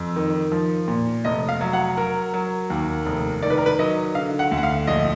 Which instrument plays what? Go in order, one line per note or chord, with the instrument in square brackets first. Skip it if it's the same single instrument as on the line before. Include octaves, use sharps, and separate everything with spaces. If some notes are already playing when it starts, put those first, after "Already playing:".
Already playing: [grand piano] F2
D#3
F3
A#2
F1 D#5
F5
F#3
F#5
F#3 A#4
F#3
D#2
F1
D#3 D5
B4
A#4
B4
F#3 D#5
D3 F5
F#5
D2
F#5
F5
A#1 D#5